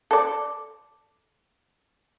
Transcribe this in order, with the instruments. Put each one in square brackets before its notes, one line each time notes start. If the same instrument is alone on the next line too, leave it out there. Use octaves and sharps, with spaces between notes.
[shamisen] A4 D5